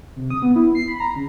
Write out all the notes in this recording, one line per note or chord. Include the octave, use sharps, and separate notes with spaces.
C3
D#6
B3
E4
C7
B5
A#5
C#3